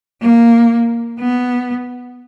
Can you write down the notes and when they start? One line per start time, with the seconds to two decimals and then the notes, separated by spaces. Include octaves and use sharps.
0.22 A#3
1.21 B3